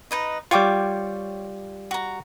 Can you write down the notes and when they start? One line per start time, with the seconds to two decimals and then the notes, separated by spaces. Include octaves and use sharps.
0.11 D#4 B4 D#5
0.51 G3 F4 C#5 G5 D6
1.91 F#4 A#5